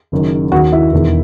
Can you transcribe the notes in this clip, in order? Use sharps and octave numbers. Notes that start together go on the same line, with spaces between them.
F#1 F#2 D#3
D#2 D#3 F#4
E4
E1 E2 D#3